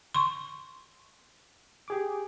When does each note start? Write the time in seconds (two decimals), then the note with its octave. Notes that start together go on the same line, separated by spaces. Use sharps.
0.15 C6 C#6
1.88 G4 G#4 D6